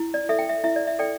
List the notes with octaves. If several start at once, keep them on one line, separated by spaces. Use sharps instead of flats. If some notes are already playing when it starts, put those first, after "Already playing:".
Already playing: E4
D5
A4 E5
G5
E5
E4 E5
D5
E5
A4 D5 G5